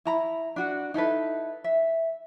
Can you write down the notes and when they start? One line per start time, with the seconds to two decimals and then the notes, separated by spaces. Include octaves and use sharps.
0.05 E4 A#5 B5
0.56 D4 F#4 F#5
0.94 D#4 E4 A4 B4
1.64 E5